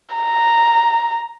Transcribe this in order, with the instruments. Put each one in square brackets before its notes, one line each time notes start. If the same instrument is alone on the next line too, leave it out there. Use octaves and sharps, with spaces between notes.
[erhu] A#5